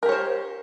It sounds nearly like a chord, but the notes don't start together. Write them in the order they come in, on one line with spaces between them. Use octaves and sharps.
A#4 G4 C#5 C5